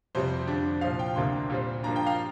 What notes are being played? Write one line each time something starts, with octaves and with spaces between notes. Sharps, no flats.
F2 C3 G3 C4 C5
F2 D3 G3 D4
C2 A#2 F3 C4 F5
G5
D2 C3 A#3 D4 C6
A#2 G3 C4
G2 F3 A#3 D4 A#5
G5
F5